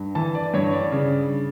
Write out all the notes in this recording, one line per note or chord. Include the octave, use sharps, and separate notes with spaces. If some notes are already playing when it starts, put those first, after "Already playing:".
Already playing: G2
E3 A5
D5
G2 C#5
D5
C#3